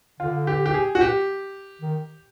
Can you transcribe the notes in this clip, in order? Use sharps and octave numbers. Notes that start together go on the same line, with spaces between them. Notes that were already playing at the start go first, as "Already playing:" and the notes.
D3 F4
G4
G4
G#4
F#4
G4
D#3